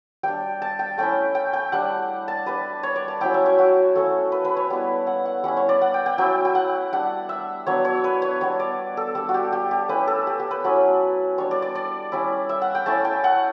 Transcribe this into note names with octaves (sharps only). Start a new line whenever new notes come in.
G3 D4 G5
A5
G5
A3 C#4 E4 G5
G5
G5
G3 D4 F#5
A5
G3 D4 B4
C#5
D5
A5
F#3 C#4 E4 G5
E5
C#5
F#4
A3 C#4 E4 A4
B4
B4
C#5
G3 B3 E4
F#5
F#5
G3 C#4 E4 F#5
C#5
D5
F#5
G5
G5
F#3 C#4 E4 G5
G5
F#5
G3 D4 F#5
E5
F#3 B3 D4 C#5
C#5
B4
C#5
G3 B3 D4 C#5
D5
A4
G3 D4 A4
F#4
G4
G4
G4
A3 C#4 E4 B4
A4
G4
G4
B4
F#3 C#4 E4
G3 D4 C#5
D5
D5
D5
G3 C#4 E4
E5
F#5
G5
A3 C#4 E4 A5
G5
F#5